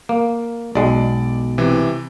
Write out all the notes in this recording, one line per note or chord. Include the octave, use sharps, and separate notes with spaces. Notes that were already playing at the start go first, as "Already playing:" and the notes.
A#3
B1 G#3 D5
C3 E3